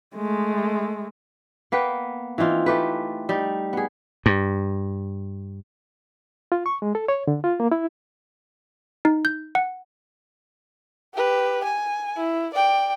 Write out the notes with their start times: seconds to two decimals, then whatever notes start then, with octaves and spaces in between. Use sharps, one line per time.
0.15 G#3 A3
1.72 A#3 B3 B4 G5
2.38 E3 C4 D#4 F4
2.66 A3 G4 B4
3.29 G3 D#4
3.73 B3 G#4
4.26 G2
6.52 F4
6.66 C#6
6.82 G#3
6.95 A4
7.08 C#5
7.28 D3
7.44 F4
7.60 A#3
7.72 E4
9.05 D#4
9.25 G6
9.55 F#5
11.14 G4 B4
11.64 G#5
12.17 E4
12.54 D5 G5